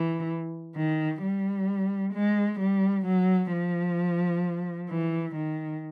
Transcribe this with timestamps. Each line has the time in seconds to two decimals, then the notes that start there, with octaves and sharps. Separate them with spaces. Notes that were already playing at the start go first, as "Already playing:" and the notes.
Already playing: E3
0.76 D#3
1.23 G3
2.14 G#3
2.60 G3
3.06 F#3
3.52 F3
4.90 E3
5.35 D#3